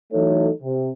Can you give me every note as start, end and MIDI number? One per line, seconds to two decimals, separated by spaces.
0.12 0.48 52
0.12 0.48 54
0.12 0.48 57
0.12 0.48 63
0.12 0.48 69
0.12 0.48 73
0.63 0.89 48